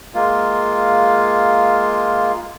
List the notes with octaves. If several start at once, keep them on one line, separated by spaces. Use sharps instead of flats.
G#3 A#3 F4